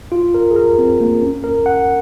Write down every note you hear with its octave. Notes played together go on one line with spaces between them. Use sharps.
F4
A#4
G#4
A#4
C4
A#3
C#4
A#4
F#5